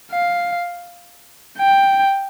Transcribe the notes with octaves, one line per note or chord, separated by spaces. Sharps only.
F5
G5